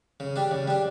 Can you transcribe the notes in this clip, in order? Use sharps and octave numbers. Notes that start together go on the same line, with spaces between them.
C#3
G3 D4
C#3
G3 D4